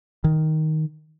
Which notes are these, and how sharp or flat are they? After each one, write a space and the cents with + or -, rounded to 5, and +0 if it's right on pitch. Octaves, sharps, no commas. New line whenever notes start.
D#3 +5